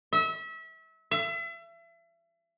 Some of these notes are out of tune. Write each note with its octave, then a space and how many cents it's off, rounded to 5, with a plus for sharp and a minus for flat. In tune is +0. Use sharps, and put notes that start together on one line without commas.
E5 -30
E5 +35